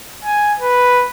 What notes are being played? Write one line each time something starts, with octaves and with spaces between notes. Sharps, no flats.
G#5
B4